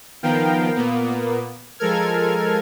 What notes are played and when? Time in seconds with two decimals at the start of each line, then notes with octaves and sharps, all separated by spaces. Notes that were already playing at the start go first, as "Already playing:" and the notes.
0.23 D#3 F3 B3 A#4 F5 G5
0.75 A#2 A#3 B3
1.79 F3 G#3 A4 A#4 F6 G#6